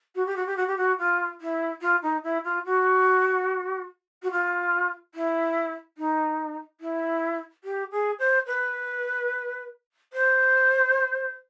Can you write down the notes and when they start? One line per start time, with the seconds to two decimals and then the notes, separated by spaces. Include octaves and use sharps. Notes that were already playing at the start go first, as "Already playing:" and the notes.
0.15 F#4
0.26 G4
0.36 F#4
0.46 G4
0.56 F#4
0.67 G4
0.77 F#4
0.98 F4
1.41 E4
1.81 F4
2.02 D#4
2.23 E4
2.44 F4
2.65 F#4
4.22 F#4
4.31 F4
5.14 E4
5.97 D#4
6.80 E4
7.63 G4
7.91 G#4
8.19 C5
8.46 B4
10.13 C5